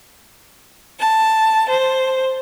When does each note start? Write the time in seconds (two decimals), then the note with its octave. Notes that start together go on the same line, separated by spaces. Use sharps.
0.99 A5
1.68 C5